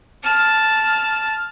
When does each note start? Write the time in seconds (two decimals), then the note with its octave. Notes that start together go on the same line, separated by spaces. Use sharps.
0.23 A5 F6